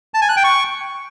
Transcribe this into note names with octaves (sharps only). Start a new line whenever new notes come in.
A5
G#5
F#6
G5
C#6